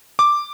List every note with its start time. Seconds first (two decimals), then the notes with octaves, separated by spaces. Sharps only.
0.19 D6